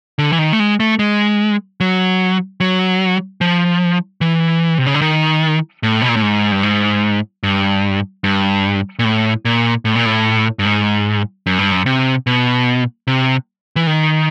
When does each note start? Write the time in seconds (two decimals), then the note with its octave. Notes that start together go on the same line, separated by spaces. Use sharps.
0.18 D3
0.32 E3
0.39 D#3
0.53 A3
0.60 G#3
0.80 A3
0.99 G#3
1.80 F#3
2.60 F#3
3.41 F3
4.21 E3
4.78 C3
4.86 C#3
4.94 D3
5.01 D#3
5.83 A2
6.02 B2
6.09 A#2
6.16 A2
6.22 G#2
6.52 G2
6.63 G#2
7.43 G2
8.24 G2
8.99 A#2
9.05 A2
9.45 A#2
9.85 A2
9.95 A#2
10.05 A2
10.59 G2
10.65 G#2
11.46 F#2
11.59 G2
11.71 F#2
11.86 C3
12.27 B2
13.07 C3
13.76 E3
13.87 D#3